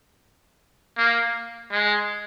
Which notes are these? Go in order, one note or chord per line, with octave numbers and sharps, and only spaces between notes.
A#3
G#3